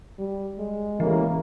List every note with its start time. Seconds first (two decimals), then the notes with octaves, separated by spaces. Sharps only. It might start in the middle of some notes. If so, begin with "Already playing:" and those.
0.19 G3
0.59 G#3
1.00 A1 C#3 E3 A#3